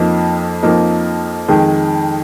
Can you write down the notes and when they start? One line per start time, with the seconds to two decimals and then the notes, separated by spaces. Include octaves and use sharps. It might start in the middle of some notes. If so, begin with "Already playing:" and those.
Already playing: F2 F3 A#3 D#4
0.63 F2 F3 A#3 D#4
1.48 F2 D#3 G#3